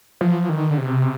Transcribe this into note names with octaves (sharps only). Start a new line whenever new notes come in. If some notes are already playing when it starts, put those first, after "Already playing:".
F3
D#3
D3
C3